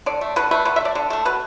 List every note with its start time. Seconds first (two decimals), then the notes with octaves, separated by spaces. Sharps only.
0.06 D3 D5
0.21 A3
0.36 D3 B4
0.51 A3 B4
0.65 D3 B4
0.76 E5
0.81 A3 D5
0.95 D3
1.10 A3 A4
1.25 B2 B4